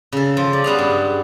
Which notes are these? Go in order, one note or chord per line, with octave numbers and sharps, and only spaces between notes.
C#3 A4
F3
D5
G3 B3 G#4 F5
G2